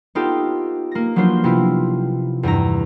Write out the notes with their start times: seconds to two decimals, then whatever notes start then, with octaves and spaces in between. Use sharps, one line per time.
0.15 B3 D#4 F4 G4 A4
0.92 A#3 A#6
1.16 F3 F#3 B3 D4 F4 C5
1.44 C3 B3 E4 F4
2.43 E2 G2 E4 A#5